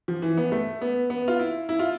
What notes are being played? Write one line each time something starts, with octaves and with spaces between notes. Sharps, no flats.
F3
E3
B3
A3
B3
B3
F4
E4
E4
F4